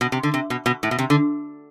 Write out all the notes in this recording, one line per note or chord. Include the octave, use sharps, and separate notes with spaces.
B2
C3
D3
C3
B2
B2
A2
B2
C3
D3